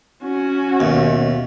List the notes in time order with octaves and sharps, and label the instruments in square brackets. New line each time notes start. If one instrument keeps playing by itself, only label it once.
[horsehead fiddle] C#4 F#4
[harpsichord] D#2 [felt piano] B2 E5